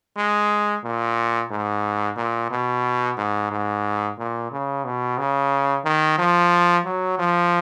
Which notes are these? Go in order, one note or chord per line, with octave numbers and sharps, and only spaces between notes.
G#3
A#2
G#2
A#2
B2
G#2
G#2
A#2
C#3
B2
C#3
D#3
F3
F#3
F3